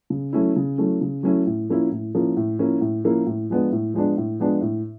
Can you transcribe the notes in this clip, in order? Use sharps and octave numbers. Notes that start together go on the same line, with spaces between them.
C#3
F#3 A3 C#4 E4
C#3
F#3 A3 C#4 E4
C#3
F#3 A3 C#4 E4
A2
F3 A#3 C#4 E4
A2
F3 A#3 C#4 E4
A2
F3 A#3 C#4 E4
A2
F3 A#3 C#4 E4
A2
F3 G#3 B3 D4
A2
F3 G#3 B3 D4
A2
F3 G#3 B3 D4
A2